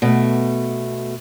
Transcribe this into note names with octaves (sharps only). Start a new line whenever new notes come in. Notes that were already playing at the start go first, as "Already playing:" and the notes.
B2 A3